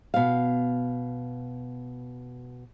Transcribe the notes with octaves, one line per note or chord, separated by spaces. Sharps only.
B2 F5